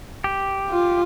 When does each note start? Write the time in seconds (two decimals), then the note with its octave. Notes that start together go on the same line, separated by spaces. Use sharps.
0.24 G4
0.70 F4